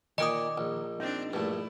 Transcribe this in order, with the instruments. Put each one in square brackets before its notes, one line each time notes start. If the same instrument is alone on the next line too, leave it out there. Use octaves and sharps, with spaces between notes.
[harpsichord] A#2 G5 C#6 [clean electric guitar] D#3 A#4 D5 [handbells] D#5 D#6
[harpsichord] A#1
[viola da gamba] C4 D4 [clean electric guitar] D#4
[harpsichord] A#1 G2 [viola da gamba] A3 E4